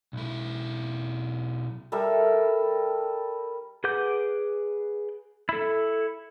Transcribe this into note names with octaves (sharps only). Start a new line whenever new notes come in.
B1 E4
G3 A4 A#4 E5
G#4 B4 F#5 D6 G6
E4 A4